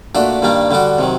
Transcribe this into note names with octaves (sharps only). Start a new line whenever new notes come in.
A#2 A3 D4 F#4
G2 D#3 G3 A#3 D4
D3 G3 D4 F#4
C3 D#3 F#3